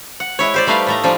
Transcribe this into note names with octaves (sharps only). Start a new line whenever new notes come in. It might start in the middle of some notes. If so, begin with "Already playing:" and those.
F#5
G#3 E4 C#5
G4 C5 D5
G3 A3 D#4 B4 F5
A2 A3 A#5
F3 G3 G#3 D4 D#4